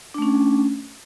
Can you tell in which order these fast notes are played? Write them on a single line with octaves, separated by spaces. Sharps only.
D4 A3 C#4